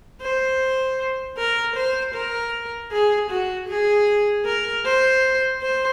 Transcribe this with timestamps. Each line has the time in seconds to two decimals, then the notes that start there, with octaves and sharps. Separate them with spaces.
0.22 C5
1.38 A#4
1.76 C5
2.14 A#4
2.92 G#4
3.30 F#4
3.69 G#4
4.45 A#4
4.85 C5
5.62 C5